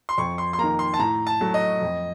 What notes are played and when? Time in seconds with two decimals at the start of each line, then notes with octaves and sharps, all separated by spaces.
0.09 C6
0.18 F2 C#6
0.38 C6
0.53 C6
0.58 D#3 A#3 A#5
0.79 C6
0.94 A5
0.99 A2 A#5
1.27 A5
1.41 F#3 A3
1.54 D#5
1.81 F2